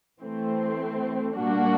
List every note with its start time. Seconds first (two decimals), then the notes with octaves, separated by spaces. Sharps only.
0.20 E3 A3 C4
1.35 A#2 G3 A#3 D4 F#4